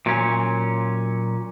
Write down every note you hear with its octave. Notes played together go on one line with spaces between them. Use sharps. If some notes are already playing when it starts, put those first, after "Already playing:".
A#2 F#3 C#4